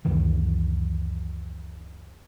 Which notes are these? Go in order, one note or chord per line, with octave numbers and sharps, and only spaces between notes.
C#2 F#2 D#3 E3